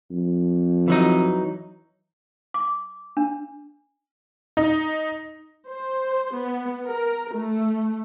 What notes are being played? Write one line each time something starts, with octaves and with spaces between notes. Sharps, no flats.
F2
E3 F#3 D#4
D6
D4
D#4
C5
B3
A#4
A3